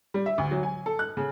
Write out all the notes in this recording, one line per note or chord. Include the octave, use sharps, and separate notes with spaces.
G3
E5
D2
F#3
G#5
A4
F#6
C#3